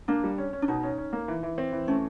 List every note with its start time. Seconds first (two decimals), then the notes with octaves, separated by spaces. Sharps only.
0.08 A#3 D4
0.24 G3
0.38 C#4
0.53 C#4
0.62 D4
0.68 B2 D#4
0.83 C#4
0.98 C#4
1.13 A#3
1.28 E3
1.43 E3
1.58 C4
1.72 E3
1.88 A3 C#4